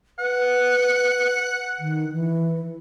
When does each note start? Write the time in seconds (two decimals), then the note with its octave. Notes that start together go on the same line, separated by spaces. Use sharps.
0.19 B4 F#5
1.79 D#3
2.13 E3